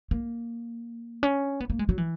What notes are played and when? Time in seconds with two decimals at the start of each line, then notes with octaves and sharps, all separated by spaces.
0.11 A#3
1.23 C#4
1.60 B3
1.70 A#3
1.79 G#3
1.89 F#3
1.98 E3